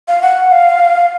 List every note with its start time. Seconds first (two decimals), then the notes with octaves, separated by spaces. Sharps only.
0.08 F5
0.22 F#5
0.52 F5